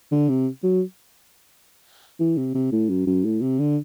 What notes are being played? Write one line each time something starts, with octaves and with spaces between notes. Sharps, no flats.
D3
C3
F#3
E3
C3
C3
A2
F#2
F#2
A2
C3
D3